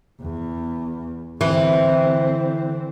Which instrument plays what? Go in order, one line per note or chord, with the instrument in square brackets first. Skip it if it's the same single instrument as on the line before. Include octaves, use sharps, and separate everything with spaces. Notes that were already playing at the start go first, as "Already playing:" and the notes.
[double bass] E2
[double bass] D3 C4 [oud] E3